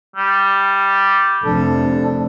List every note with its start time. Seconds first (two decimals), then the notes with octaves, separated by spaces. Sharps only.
0.16 G3
1.44 F1 D4 A4